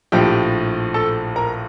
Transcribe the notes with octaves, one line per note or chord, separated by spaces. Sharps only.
A#1 A2 F3 G4 G5
A4 A5
A#4 A#5